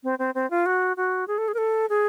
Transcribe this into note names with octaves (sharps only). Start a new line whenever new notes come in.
C4
C4
C4
F4
F#4
F#4
G#4
A4
G#4
A#4
A4
G#4